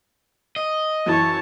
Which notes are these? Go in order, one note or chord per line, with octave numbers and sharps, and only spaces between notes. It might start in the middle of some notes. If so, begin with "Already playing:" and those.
D#5
F#2 E3 E4 C#5 A5